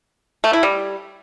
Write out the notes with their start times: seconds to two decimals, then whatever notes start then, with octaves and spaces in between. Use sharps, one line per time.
0.44 A3
0.53 E4
0.63 G3